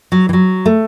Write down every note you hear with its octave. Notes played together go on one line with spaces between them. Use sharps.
F#3
E3
F#3
A3